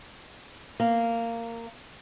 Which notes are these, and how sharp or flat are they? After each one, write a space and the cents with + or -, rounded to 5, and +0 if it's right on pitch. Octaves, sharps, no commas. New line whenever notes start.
A#3 -15